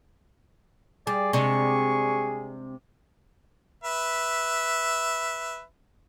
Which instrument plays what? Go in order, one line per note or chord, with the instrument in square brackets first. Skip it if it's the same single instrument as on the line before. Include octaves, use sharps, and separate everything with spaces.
[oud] G3 [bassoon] G#4 [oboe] D5
[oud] C3 G#3 D4 [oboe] C#6
[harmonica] B4 E5